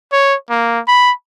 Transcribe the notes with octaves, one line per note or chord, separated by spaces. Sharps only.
C#5
A#3
B5